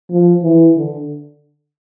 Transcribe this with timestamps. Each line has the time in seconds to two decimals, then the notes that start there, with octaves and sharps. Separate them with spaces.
0.10 F3
0.43 E3
0.76 D3